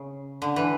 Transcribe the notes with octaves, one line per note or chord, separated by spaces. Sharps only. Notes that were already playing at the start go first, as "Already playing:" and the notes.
Already playing: C#3
D3
E3